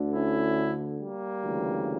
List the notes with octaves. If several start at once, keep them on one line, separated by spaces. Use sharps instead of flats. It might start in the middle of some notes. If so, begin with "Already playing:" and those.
Already playing: D2 D3
C#4 E4
G3 A#3
D2 C#3 E3